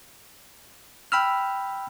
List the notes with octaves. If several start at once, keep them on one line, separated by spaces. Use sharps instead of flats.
G5 B5 E6 F6